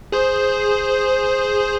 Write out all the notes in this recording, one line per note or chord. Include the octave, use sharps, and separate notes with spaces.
G#4 C5